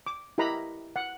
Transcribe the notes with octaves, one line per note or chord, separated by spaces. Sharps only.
D6
E4 G4 A#4 D#5 A#5 B5
F#5